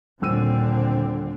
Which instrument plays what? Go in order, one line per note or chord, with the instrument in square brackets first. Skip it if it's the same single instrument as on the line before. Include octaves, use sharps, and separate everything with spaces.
[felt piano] D#1 E6 D#7 [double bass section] A#2 D3 C4